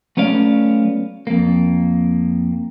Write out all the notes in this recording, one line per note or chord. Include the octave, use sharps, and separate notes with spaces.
F#3 A3 B3 C#4 D5 F5
F2 A#3